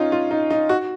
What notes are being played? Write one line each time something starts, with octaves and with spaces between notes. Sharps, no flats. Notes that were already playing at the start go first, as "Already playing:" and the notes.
Already playing: C#4 D#4 F4
F4
D#4
D#4
F#4